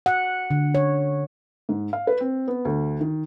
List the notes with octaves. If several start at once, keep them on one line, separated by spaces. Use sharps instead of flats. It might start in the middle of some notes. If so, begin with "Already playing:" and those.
F#5
D3
C#5
G#2
F5
B4
C4
B3
D2
D#3